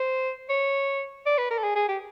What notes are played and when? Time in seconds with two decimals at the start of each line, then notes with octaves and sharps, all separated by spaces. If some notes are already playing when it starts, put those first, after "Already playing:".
Already playing: C5
0.49 C#5
1.26 D5
1.38 B4
1.51 A#4
1.58 A4
1.64 G#4
1.76 G#4
1.88 G4